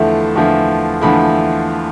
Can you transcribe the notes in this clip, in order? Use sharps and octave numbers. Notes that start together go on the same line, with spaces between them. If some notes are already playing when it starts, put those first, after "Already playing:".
Already playing: E2 D3 F3 A3 E4 A5
E2 D3 F3 A3 E4
E2 D3 F3 A3 E4 B5